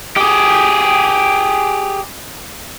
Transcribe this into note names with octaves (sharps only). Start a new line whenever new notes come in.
G4 G#4